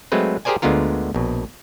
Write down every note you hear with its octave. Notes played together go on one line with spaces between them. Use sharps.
F#3 G#3 A3 C4 B4
G4 G#4 A#4 C5 D5 G#5
D2 D3 G#3 B3 F4 A#4
A#1 B2